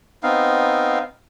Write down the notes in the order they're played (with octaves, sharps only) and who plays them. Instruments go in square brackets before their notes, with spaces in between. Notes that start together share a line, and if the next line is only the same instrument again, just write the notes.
[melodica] B3 C4 D#4 F5